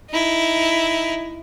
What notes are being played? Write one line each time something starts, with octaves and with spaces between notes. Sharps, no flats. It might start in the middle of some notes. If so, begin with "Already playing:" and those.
D#4 E4